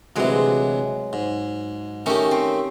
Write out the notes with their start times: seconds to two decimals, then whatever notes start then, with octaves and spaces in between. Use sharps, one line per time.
0.16 D2 C3 E3 F#3 G#3
1.13 G#2
2.06 D#3 A3 C#4 D#4 G4
2.31 C4